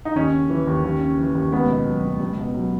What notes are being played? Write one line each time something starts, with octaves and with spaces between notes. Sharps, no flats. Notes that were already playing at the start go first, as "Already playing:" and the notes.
D#4
D#2 C#4
C#3
E3
D#2
D#2
C#3
E3
D#2
C#2 B3
B2
F#3
C#2
C#2
B2
F#3